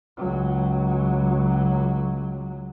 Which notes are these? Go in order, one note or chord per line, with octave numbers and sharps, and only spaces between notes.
C#2 F#3